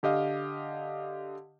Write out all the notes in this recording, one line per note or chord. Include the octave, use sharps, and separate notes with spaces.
D3 G4 D#5 F5